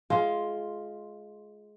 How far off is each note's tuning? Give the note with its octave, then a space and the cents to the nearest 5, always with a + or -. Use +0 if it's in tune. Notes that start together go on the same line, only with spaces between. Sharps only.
G#3 +20 F4 +0 F5 +0